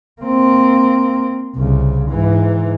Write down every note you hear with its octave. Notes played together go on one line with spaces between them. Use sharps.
A#3 C4
C2 C#3
G#2 E3